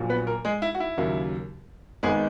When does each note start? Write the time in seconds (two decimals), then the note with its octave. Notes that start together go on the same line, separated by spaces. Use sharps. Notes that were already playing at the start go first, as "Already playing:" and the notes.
Already playing: A#1 A#2 F#3
0.09 B3 B4
0.27 A#3 A#4
0.45 G#3 G#4
0.62 E4
0.75 F#4
0.80 E4
0.97 D#2 C#3 F#3 A#3
2.03 G#1 G#2 D#3 G#3 B3 G#4